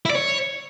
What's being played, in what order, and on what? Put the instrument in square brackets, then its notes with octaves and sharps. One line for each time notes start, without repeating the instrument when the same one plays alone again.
[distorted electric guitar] E4
D5
C#5